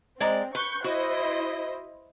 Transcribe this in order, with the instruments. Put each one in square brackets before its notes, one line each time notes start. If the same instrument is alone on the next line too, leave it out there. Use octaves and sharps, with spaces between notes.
[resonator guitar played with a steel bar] G#3 D5 A#5 [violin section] C4
[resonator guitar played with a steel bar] B4 [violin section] C#6 G6
[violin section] E4 C5 D#5 [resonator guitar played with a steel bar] F#4